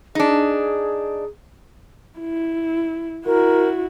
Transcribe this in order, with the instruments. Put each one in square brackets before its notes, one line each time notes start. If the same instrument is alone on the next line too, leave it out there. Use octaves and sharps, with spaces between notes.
[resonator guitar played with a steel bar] D4 D#4 [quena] G#4
[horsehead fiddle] E4
[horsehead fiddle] E4 F#4 [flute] A#4